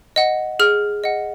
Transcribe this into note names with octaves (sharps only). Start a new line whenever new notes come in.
D#5 F#5
G#4 F6
D#5 F#5